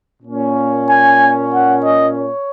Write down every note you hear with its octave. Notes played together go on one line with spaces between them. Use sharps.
A#2 A#3 C#4
G#5
F#5
D#5
C#5